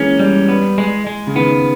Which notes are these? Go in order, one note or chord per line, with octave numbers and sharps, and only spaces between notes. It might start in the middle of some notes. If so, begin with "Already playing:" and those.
Already playing: E3 G#3 A#3 C#4
G3
B3
G#3
G#3
C#3
D#3 B3